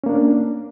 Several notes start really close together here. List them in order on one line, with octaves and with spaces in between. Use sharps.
C#4 A#3 D4